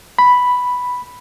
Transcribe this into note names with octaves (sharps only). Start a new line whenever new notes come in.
B5